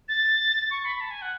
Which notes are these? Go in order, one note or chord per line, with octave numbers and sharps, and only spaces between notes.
A6
C#6
B5
A5
G#5
F#5